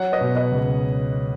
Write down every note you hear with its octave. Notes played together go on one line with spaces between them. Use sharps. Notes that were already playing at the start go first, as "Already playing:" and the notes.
Already playing: F#3 C#5 F#5
B4 D#5
B2
B4 D#5
C#2